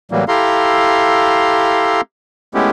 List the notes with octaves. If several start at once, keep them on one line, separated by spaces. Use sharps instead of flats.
A2 E3 F#3 G3 A#3
E4 G4 A4 F5 A#5 C6
G#3 A3 B3 C#4 E4 G4